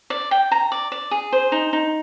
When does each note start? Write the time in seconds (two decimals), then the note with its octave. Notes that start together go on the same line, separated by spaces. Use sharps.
0.10 D5
0.31 G5
0.52 A#5
0.72 D5
0.92 D5
1.11 G#4
1.33 C5
1.52 D#4
1.73 D#4